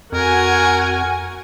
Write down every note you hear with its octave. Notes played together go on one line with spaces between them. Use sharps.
F2 F#4 A#4 F#5 G#5